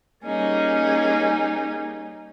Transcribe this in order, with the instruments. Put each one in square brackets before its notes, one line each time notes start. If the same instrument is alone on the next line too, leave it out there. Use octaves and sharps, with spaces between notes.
[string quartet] G3 A#3 C#4 D#4 G#4